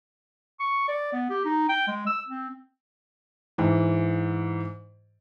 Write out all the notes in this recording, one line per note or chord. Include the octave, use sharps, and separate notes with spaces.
C#6
D5
B3
G4
D#4
G5
G#3
E6
C4
G#2 E3